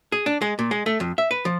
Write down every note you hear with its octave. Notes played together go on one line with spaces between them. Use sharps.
G#4
D4
G#3
A#2
G#3
A3
F2
E5
B4
F3